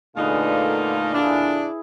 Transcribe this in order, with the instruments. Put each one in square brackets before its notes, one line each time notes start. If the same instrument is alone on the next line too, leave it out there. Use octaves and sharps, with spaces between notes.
[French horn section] A#2 D3 [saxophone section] A3 D#4 [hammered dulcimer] G#4 B4 [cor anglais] F5
[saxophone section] D4 [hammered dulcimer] E4 G#4